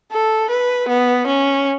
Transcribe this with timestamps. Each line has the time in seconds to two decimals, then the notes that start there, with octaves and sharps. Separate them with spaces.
0.12 A4
0.50 B4
0.89 B3
1.27 C#4